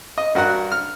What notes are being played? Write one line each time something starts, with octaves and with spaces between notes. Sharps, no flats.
D#5
G2 F#4 A#4 F#5
F6